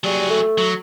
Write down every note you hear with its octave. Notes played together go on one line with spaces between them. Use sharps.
F#3 G3 G#4
A3
F#3